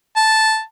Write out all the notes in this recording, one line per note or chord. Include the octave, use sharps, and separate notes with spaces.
A5